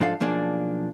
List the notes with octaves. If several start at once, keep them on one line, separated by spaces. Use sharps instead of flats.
G#2 F3 D4 A4 F5
B1 F3 A#3 D4 G#4 D5